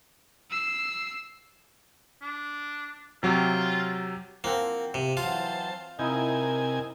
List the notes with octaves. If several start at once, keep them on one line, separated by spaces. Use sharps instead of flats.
E6 C7
D4
C3 F#3 F4 G4
F3 A#3 C4 F#5
C3
E3 F#3 F4 C5 A5
C3 D#4 E4 A#4 D#5 G#5